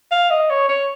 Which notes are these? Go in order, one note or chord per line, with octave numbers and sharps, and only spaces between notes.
F5
D#5
C#5
C#5